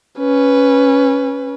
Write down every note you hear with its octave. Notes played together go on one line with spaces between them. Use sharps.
C#4 B4